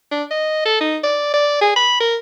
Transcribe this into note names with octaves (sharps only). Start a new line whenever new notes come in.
D4
D#5
A4
D#4
D5
D5
G#4
B5
A#4